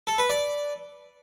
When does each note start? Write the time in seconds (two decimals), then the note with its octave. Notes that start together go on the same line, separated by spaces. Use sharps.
0.07 A4
0.18 B4
0.30 D5